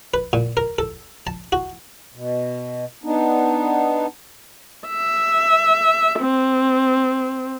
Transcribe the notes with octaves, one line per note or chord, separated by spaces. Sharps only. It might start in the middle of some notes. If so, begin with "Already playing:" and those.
B4
A#2
A#4
A4
A5
F#4
B2
B3 D4 D#4
E5
C4